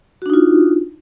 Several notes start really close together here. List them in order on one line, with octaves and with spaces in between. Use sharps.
F#4 D4 D#4 F4